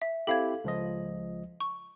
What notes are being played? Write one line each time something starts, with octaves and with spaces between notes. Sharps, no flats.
E5
C4 E4 G4 A4 F5 G#6
C#2 F3 D#5
C#6